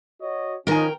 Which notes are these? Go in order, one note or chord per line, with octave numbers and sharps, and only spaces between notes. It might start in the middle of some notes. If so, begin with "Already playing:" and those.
F#4 C#5 D#5
D#3 F3 C#4 D#4 A#4 G5 G#5